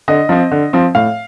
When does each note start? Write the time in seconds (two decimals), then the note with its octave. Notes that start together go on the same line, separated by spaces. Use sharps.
0.08 D3 D#5
0.29 F3 C4
0.51 D3
0.73 F3 C4
0.95 A2 F5